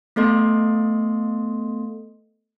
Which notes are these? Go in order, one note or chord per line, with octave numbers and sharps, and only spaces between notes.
A3 B3 A4 D#5 C6